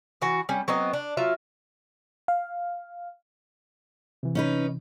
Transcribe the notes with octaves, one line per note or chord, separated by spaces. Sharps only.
E3 F#4
G3 C#4
F#3 B3 C4 D#5
D4
F#3 F4 E5
F5
C3 E3
C#4 D#4 B4